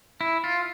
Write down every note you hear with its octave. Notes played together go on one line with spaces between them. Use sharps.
E4
F4